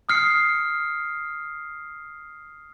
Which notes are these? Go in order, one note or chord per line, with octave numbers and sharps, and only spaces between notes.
D#6 F6 C7 C#7